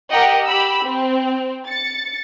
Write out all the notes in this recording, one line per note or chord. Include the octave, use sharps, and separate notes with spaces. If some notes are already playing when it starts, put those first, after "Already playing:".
G4 A#4 D#5 F#5 G5
G4 B5 E6
C4
A6 C#7